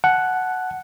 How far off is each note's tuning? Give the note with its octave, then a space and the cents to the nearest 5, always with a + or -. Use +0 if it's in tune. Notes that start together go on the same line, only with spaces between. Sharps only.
F#5 +0 A5 -25